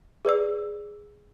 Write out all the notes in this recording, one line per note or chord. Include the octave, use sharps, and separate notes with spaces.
G#4 B4 D5 E6